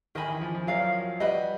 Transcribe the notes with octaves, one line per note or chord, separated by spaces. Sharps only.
D#3 A#4 D#5 G#5 B5
E3
F3
F3
F#3 A#4 D5 F5
G3 B4 D#5 F#5 B5